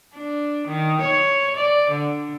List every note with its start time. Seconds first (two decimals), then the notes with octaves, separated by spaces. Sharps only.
0.15 D4
0.68 D#3
1.01 C#5
1.57 D5
1.91 D3